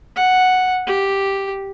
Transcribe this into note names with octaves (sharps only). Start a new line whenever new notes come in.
F#5
G4